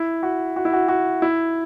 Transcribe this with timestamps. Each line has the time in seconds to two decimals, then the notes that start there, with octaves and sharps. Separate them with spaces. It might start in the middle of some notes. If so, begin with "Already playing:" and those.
Already playing: E4
0.23 F#4
0.56 F#4
0.65 E4
0.73 F#4
0.88 F#4
1.22 E4